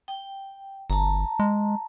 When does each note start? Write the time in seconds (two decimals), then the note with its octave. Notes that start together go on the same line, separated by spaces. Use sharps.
0.08 G5
0.90 G1 A5 A#5
1.39 G#3